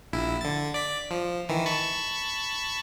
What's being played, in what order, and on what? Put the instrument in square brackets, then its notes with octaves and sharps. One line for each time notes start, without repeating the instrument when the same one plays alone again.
[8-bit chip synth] A#1 E4
D3 A6
D5 B6
F3
D#3 E3
A5 B5 C#6